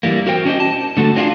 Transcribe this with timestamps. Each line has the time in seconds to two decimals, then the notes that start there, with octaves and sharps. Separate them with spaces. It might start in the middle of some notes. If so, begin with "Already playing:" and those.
0.03 E3 G3 A#3
0.27 F#4 A#4 C5 G5
0.45 C#4 D4 F#4 C5 D#5
0.60 A5
0.97 D3 A3 F#4 A4
1.15 A#3 C4 D4 F4 F#4 G#4